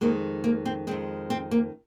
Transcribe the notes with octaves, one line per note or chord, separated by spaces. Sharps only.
F2 D#3 G#3 A#3
A#3
C4
F2 D#3 G#3 C4
C4
A#3